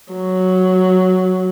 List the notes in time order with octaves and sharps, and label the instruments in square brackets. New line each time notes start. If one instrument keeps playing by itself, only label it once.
[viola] F#3